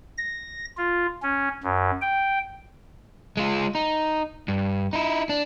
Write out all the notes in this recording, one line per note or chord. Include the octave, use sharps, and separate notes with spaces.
A#6
F4
C#4
F#2
G5
G#3 F4
D#4
G2
D#4 E4
D4